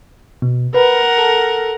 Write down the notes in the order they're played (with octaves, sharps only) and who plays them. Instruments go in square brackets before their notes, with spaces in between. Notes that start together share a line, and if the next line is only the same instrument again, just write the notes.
[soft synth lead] B2
[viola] A#4 F#5 [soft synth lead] B4
[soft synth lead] A4